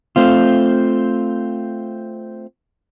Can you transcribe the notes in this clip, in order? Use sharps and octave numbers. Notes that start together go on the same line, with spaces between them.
A3 C4 F4